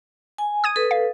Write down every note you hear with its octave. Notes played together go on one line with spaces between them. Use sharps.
G#5
D#6 G#6 D#7
A4 B4
F5